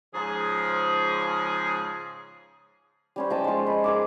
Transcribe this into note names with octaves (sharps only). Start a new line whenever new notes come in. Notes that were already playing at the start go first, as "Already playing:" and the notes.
G#2 C#3 F3 G#4
G3 C#4 C5
F3 D#5 G5 A5
G#3 F4
B5
G#4 A#4 D6